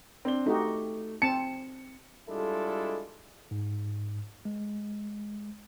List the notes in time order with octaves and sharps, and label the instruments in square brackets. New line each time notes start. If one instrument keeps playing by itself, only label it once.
[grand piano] C4 D4 G7
[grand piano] A3 [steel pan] D#4 F#4 G4
[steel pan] C4 A5 [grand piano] C#7
[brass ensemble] G3 G#3 D4 E4 F4 A4
[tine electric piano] G#2
G#3